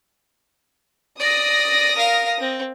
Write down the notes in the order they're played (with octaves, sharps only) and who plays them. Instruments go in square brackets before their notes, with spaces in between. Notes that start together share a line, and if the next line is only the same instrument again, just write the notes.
[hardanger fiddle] D5 [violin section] D#6 A#6
[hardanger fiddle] A#4 F5
C4